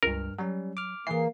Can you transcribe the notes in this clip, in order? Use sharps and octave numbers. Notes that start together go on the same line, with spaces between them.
C#2 G2 A#4 F6
F#3 G3 C#4
D6 F6
E3 A#3 G#4 C7